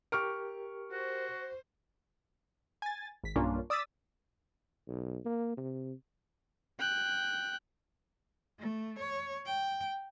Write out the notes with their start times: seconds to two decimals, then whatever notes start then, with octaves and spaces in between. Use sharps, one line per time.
0.12 G4 A#4 C#6 F6 D7
0.92 F#4 C5
2.82 G#5 A6
3.24 G#1 B6
3.36 B1 G2 A#3 C#4 D4 F4
3.70 D5 D#6 E6 A6 B6
4.88 B1
5.25 A#3
5.57 C3
6.79 G5 F#6
8.59 A3
8.99 C#5
9.46 G5